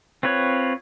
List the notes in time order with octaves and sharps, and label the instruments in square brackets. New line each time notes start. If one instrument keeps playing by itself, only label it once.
[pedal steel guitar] C4 F4 B4 C#5